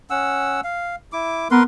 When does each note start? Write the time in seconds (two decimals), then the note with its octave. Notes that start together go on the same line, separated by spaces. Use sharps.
0.10 C#4 F#5 E6
0.64 F5
1.13 E4 D6
1.51 B3 A#4 B4 C6